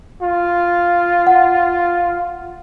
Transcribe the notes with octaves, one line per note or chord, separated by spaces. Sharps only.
F4
F#5